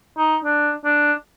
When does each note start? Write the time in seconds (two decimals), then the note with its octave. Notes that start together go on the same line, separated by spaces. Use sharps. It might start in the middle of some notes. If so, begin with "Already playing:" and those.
0.18 D#4
0.45 D4
0.85 D4